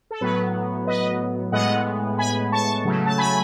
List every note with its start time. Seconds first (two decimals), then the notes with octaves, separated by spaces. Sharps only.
0.11 A4
0.21 A2 F#3 B3 B4
0.87 B4 D#5
1.52 A2 G#3 B3 D#5 F#5
2.18 G#5 B5
2.52 A5 C#6
2.85 C#3 F#3 A3
3.06 A5
3.18 G#5 B5